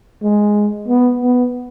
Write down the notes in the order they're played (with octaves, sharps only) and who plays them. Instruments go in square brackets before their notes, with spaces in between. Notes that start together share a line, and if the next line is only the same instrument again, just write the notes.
[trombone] G#3
B3
B3